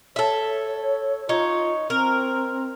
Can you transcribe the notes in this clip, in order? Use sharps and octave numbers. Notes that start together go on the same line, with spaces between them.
A4 C#5 E5
D#4 F4 C#5
C4 A#4